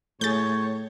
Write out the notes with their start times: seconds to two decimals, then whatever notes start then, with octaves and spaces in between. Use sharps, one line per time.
0.21 A2 A3 G#4 C#5 G6 A6